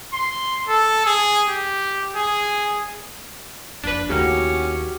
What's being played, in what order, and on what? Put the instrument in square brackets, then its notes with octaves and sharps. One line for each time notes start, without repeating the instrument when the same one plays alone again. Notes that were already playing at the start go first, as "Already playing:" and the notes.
[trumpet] C6
A4
G#4
G4
G#4
[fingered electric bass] F#1 F2 [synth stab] D4 B4
[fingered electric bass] D#2 [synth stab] A2 C#3 A#3 [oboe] C#4 [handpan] F#4 G4